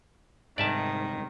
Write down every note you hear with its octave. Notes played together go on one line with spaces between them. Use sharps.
G#2 C3 D#3 G3 G#3 D5 E5 A5